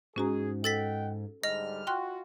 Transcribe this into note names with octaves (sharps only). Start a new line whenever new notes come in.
G#2 C#4 F#4 G#4 A#5
A4 D#5 F#5 G5 A6 B6
G#2 D3 G3 D#5 F6
F4 F#4 G5 C6 F#6